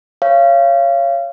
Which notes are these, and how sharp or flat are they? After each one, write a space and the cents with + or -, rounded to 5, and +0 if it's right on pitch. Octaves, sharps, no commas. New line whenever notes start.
C#5 +0 F5 -25